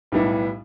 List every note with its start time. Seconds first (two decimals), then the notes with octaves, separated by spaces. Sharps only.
0.12 B1 A2 G3 B3 E4